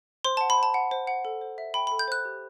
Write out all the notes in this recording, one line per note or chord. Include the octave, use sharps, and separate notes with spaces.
C5 C6
F#5 A5
B5
C5 A5
F#5
C5
F#5
A4
C5
E5
G5 B5
A4 B5
G6
C5 F#6
G4